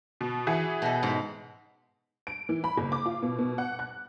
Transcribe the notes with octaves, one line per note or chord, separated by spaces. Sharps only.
B2
E3 F#4 G#4
B2 A4
G#2 B5
D7
E3
B5
F#1
D6
F4
B2
B2
F#5
F#6